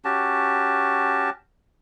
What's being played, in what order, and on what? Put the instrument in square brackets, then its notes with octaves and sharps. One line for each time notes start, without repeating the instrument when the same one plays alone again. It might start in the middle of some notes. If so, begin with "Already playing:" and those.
[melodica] C#4 F#4 G4 A5